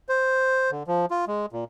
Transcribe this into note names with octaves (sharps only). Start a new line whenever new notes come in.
C5
D3
F3
F4
G#3
A#2